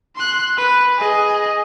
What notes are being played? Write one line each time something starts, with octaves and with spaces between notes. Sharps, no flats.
C6 F#6
B4
G#4 D#5